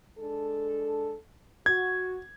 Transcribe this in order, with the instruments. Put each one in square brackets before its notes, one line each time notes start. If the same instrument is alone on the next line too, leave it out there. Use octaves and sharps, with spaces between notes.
[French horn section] G#3 D4 A4
[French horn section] F#4 [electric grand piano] G#6